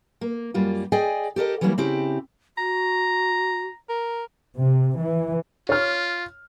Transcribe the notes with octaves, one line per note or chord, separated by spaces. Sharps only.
A#3
F#2 G3 A#3 F4
G#4 D5 D#5 G5 G#5
G4 A4 A#4 D#5
E3 F#3 G3 A3 A#3 E4
C#3 C4 E4 G4
F#4 A#5
A#4
C3
E3
F4 C#5 F6